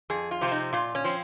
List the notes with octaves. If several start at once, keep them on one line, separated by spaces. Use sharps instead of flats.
F2 G#4
F4
C3 F3 C4
D#4
A#2 F4
C#4
F3 C4